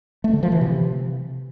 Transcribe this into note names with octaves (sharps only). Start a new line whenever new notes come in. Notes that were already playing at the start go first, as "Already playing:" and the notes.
A3
D3
F3
E3
C3